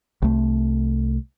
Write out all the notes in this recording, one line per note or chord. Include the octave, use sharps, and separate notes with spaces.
C2 A3